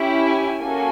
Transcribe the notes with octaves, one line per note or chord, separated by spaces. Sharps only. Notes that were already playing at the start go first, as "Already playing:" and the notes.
Already playing: C#4 E4 G4
G#5
A#3 C#4 F#4 A4 G#5